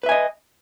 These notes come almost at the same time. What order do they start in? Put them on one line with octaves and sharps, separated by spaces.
B4 E5 G#5 D#5